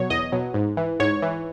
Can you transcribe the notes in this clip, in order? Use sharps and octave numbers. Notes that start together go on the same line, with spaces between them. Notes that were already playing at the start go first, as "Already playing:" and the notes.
Already playing: B2 F#3 C#5
E2 D#5
B2 F#3
G#2
E3
G#2 C#5
E3